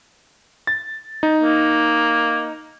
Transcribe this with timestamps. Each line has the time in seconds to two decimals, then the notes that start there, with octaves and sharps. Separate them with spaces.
0.67 A6
1.23 D#4
1.42 A#3